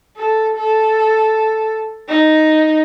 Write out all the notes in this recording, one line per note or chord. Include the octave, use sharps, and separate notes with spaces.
A4
A4
D#4